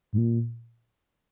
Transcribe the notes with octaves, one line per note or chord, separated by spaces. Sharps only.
G#2
A#2